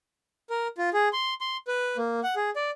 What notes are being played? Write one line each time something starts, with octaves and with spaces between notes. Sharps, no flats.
A#4
F4
G#4
C6
C6
B4
A#3
F#5
G#4
D5